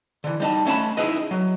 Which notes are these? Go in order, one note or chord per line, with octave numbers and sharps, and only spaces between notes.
D3 E3
G3 D#4 A5
A3 C#4 F5 A5 B5
D#4 E4 G#4 B4 D#5
F#3